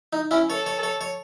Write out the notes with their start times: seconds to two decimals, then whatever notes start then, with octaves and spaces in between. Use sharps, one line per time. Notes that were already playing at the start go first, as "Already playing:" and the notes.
0.13 D#4
0.31 C#4 E4
0.50 A4 C#5
0.66 C#5
0.83 C#5
1.01 C#5